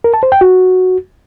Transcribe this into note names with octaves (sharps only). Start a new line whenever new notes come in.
A#4
A5
C5
G5
F#4